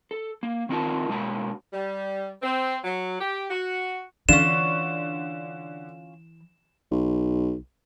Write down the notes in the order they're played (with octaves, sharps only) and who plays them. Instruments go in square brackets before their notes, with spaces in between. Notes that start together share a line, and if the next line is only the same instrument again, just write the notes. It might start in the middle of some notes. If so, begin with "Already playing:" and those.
[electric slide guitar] A4
A#3
D#3 C4 D#4 F4 A#4 A5
B2 G#3 A#3 F#4 A5
[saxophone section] G3
C4
F#3
G4
F#4
[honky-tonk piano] D3 [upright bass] E3 [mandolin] C#4 F4 [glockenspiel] E7
[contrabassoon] B1